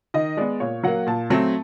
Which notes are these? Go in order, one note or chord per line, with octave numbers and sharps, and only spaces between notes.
D#3 D#5
G#3 B3 D5
A#2 C#5
F#3 A#3 F#5
A#2 A5
F#3 A3 C4